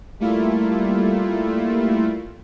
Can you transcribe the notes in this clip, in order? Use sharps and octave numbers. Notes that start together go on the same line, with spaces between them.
G3 A3 A#3 E4 F4